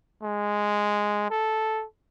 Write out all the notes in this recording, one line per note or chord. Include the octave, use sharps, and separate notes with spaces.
G#3
A4